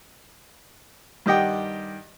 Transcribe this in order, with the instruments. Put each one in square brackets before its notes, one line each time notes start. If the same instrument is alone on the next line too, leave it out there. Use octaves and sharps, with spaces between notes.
[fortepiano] G2 D#3 G4 D#5 F#5 G5